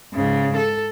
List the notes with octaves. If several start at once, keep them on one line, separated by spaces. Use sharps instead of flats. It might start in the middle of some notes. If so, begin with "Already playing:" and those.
G#2 C#3
A4